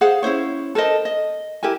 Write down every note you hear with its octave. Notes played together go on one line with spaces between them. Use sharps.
G#4 C5 F5 F#5
C#4 E4 C5 C#5
A4 A#4 C5 D#5
D#5
E4 G4 A#4 G#5